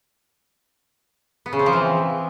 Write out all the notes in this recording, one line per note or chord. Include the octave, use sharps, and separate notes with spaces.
B3
C#3
C4
F3
E3